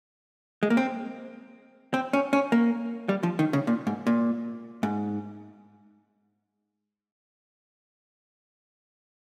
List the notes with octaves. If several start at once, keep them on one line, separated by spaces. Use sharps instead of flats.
G#3
A#3
C4
C4
C#4
C#4
A#3
G3
F3
D#3
C#3
A#2
G#2
A#2
G#2